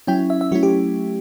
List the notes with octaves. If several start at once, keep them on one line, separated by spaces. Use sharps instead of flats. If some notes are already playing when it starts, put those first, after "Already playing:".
F#3 C#4 E4 G5
E5
E5
F#3 A3 C#4 E4 F#4
G4